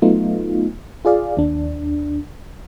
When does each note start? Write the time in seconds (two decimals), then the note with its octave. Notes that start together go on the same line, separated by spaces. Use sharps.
0.02 F#3 A3 B3 D#4 F4
1.05 F4 G#4 D5 F5
1.37 D#2 D4